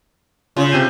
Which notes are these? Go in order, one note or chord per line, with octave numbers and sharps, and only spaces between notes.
C#3 F4
C3 G6 D#7